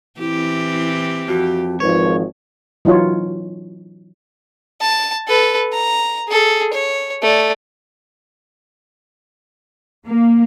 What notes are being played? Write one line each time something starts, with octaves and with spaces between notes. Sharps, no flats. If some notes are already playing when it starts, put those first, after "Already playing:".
E3 C4 E4 G4
F2 F#4
G#1 F3 B4 C#5
E3 F#3 D#4 F4 C#5
A5
A4 B4
A#5
G#4 A4
C#5
A3 D5
A#3